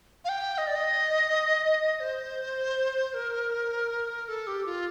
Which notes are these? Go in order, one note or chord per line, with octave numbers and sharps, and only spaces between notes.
F5
G5
D#5
D5
D#5
C5
A#4
A4
G4
F4